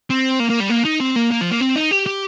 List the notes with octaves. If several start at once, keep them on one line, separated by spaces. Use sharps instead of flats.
C4
A#3
A#3
G3
A#3
D#4
C4
A#3
A#3
F3
A#3
C4
D#4
G4
G4